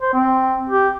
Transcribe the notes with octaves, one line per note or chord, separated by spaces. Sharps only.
C5
C4
G4